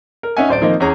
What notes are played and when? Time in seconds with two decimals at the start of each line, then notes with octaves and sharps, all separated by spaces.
0.23 A#4
0.37 C#4 D#4 E5 F#5 G#5
0.49 D1 C5 D5 D7
0.61 D#3 F3 A#3 C4 D#4
0.80 E2 C#4 G#4 C#5 A#5